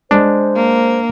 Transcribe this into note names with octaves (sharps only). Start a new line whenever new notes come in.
G#3 D4 C5
A#3